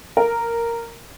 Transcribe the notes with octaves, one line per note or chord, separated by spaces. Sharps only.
A#4